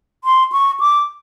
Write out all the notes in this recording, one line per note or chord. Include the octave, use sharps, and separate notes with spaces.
C6
C#6
D6